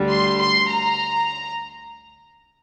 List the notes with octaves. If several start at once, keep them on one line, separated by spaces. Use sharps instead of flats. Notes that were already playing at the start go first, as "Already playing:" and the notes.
Already playing: D2 D3 G3
C6
C6
A#5